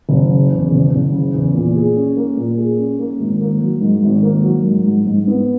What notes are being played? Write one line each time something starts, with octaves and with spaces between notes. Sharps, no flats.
F#1
C#3
E2
F#1
F#1
C#3
E2
A#2
G#4
C#4
A#3
A#2
G#4
C#4
A#3
G#1
A#3
F#3
G#2
G#1
A#3
F#3
G#2
G#2
G#2
B3